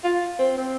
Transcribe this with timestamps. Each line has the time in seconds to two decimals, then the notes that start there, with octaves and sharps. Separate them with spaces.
0.04 F4
0.39 C4
0.58 C4